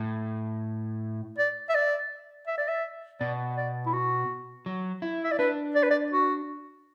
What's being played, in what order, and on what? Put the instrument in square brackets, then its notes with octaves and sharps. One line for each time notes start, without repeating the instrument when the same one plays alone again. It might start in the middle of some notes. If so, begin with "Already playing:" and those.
Already playing: [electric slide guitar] A2
[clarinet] D5
E5
D5
E5
D5
E5
[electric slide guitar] B2 [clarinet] D5
[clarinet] D5
E4
F#4
[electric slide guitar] F#3
E4
[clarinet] E5
D5
[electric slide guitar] D4 [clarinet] B4
[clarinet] D5
B4
D5
F#4